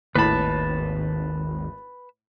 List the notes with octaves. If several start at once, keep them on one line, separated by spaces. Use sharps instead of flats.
G#1 D#2 A2 B4 A5 B5